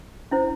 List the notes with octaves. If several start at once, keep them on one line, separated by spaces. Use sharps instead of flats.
C#4 E4 C5